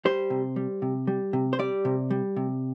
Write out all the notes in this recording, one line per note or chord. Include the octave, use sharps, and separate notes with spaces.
G3 C5
C3
G3
C3
G3
C3
C5
G3 D5
C3
G3
C3